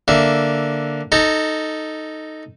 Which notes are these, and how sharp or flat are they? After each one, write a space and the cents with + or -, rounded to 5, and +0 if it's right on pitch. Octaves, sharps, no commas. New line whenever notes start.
D3 +0 A#3 +0 E5 +0
D#4 +0 A4 +0 A#5 -20